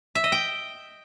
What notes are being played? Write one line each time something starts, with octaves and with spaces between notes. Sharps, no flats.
E5
D#5
G5